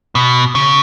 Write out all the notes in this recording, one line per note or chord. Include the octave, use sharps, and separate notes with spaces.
B2
C#3